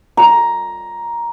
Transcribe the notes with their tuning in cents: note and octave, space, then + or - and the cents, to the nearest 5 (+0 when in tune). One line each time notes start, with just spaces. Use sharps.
A#5 +10